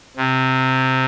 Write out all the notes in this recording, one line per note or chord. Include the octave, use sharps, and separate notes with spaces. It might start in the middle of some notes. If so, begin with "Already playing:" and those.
C3